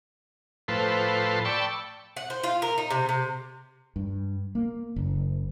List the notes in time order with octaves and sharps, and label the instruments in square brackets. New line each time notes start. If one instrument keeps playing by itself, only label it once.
[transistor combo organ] A2 F3 A4 B4 C5
D5 G5 A5 B5 C#6 E6
[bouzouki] F#5
C5
F4
A#4
D#4
C3
C3
[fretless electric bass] G2
A#3
F#1